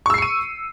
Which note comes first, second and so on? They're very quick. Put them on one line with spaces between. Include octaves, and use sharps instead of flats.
C#6 E6 C7 C#7 D#7